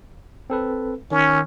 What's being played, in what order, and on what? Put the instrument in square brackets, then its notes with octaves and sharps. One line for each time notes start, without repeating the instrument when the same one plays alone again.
[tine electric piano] C4 A4 B4
[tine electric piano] D#3 [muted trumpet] C#4